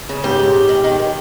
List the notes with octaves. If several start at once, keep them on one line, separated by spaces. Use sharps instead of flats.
C#3
G#2 G4
G#2
G#2
D#3
D#3
D#3